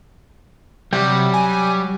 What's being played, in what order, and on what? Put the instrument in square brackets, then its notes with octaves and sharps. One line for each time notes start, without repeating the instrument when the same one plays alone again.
[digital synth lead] C3 [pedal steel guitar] F#3 F#4 G5 [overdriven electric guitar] G3
[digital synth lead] G#5